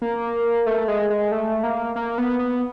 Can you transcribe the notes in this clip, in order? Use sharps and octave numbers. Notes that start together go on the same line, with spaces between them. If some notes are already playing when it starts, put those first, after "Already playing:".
A#3
A3
G#3
G#3
A3
A#3
A#3
B3
B3